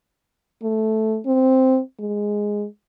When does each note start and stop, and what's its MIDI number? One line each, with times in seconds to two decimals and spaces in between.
0.62 1.19 57
1.26 1.80 60
1.99 2.65 56